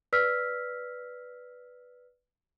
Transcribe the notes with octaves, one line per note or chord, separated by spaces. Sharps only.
B4 D5 E6 F6 B6